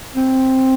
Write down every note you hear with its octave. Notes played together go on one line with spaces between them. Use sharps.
C4